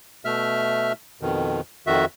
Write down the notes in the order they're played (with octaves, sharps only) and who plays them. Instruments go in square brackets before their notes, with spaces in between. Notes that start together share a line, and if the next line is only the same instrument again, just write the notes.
[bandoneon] B2 A3 E5 F6
F2 B2 D#3
F2 D#3 F#4 E5